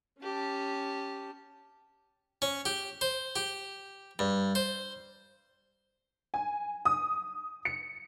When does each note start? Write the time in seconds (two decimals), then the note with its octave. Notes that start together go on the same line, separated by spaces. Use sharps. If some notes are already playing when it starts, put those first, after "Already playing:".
0.21 C#4 G4 A5
2.42 C#4
2.66 G4
3.01 C5
3.36 G4
4.19 G2
4.55 C5
6.34 G#5
6.85 D#6
7.65 C#7